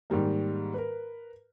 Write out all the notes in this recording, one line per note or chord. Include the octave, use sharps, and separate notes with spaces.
G#2 D#3 G3 A#3
A#4 B4